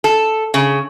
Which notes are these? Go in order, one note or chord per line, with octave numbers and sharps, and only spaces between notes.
A4
C#3